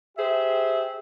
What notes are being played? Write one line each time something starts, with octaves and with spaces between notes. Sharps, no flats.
G4 G#4 C5 E5